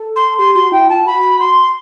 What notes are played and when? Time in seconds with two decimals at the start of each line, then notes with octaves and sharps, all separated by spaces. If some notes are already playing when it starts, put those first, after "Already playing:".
Already playing: A4
0.16 C6
0.38 G4 C6
0.55 F#4 C6
0.72 E4 G5
0.89 F4 A5
1.06 F#4 B5
1.40 C6